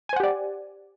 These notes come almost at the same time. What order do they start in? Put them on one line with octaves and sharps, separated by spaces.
G#5 C5 F#5 G4 D5